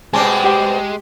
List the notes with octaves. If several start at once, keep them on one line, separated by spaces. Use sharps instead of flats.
B2 G3 G#3 C4 G#5 A5 D6
G4 G5